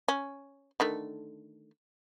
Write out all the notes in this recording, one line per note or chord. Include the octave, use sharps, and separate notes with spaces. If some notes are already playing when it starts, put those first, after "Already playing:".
C#4
D3 D#3 A3